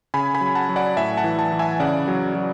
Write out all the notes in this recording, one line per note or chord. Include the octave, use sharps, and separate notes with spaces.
C#3 G#5 B5
G#5 B5
F#3
F#5 A5
F#3
D5 F#5
A2 E5 G#5
F#5 A5
E3
F#5 A5
E3
E5 G#5
C#3 D5 F#5
F#3
F#3